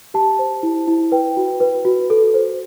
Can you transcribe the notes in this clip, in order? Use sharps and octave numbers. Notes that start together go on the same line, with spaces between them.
G4 A5
C5
E4
E4
B4 G5
F#4
B4
F#4
A4
C5